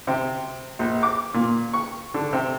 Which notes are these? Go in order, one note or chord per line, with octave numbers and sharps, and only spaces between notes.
C3
A#1
D6
A#2
C#6
D3
C3